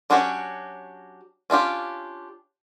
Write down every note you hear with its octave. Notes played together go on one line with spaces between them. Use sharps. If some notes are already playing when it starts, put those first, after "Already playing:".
F#3 C#4 D4 F#4 G4
C#4 D4 F4 G4